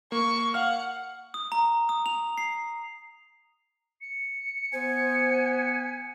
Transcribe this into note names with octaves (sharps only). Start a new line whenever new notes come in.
A#3 C#6
F5 F#5 F6
D#6
A#5
D#6
F7
C7
C#7
B3 C5 G#5